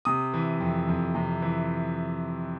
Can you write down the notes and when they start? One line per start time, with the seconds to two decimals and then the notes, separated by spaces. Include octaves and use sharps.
0.05 C3 D#6
0.33 E3
0.60 F2
0.88 F2
1.15 C3
1.42 E3